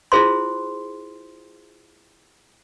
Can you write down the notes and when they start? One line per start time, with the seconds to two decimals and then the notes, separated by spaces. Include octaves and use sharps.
0.12 E4 F4 G#4 C5 C6